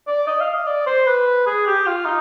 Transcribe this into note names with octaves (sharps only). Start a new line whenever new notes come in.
D5
D#5
F5
D#5
D5
C5
B4
G#4
G4
F4
D#4